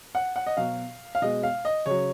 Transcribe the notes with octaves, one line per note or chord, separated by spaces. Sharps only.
F#5
F#5
D#5
B2 F#3 F5
F5
B2 G#3 D#5
F5
D#5
C#3 F#3 C#5